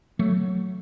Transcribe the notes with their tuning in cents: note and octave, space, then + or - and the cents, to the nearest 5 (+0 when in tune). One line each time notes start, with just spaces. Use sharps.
F#3 +0 A3 +0